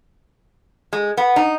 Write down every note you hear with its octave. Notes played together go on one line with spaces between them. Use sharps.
G#3
B3
D#4